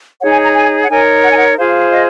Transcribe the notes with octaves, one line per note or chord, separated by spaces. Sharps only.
D#4 G#4 C#5 F#5
G#5
A#5
G#5
F#5
D#4 A#4 C#5 G#5
F#5
G#5
F#5
F4 G#4 C5 F5
D#5